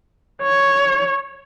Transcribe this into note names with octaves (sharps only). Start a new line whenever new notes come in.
C#5